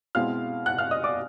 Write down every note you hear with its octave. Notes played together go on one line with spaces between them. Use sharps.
B2 G#3 C4 E4 F5 F6
F#5 F#6
F5 F6
D#5 D#6
D5 D6